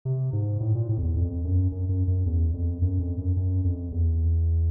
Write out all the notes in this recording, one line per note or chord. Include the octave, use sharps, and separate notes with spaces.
C3
G#2
A2
A#2
A2
F2
E2
F2
F#2
F#2
F#2
F#2
E2
F2
F#2
F2
F#2
F#2
F2
E2